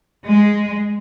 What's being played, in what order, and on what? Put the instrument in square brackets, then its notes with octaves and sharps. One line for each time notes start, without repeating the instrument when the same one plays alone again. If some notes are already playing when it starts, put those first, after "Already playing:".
[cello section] G#3